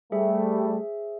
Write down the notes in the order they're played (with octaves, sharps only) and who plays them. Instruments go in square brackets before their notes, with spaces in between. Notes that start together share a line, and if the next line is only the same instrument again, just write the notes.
[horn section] G3 A3 [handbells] G#4 C5 E5